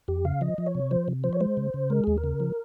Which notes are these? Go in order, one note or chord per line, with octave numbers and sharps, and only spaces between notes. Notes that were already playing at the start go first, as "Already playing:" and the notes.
F2 G4
C#3 F5
F3 D#5
F3
C#5
C3
F3 C5
C3
F3 C5
C#5
G#3 C5
C#3
C#3
G#3 A#4
D#2 G#4
A#4
C#3
F3